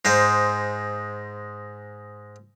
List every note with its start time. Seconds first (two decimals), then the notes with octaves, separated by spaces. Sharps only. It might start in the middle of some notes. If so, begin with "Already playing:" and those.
0.05 G#2 G#3 C5